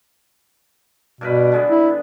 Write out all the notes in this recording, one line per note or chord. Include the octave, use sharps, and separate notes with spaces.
G2 B2 A#4 B4
D3 G#3 B3
E4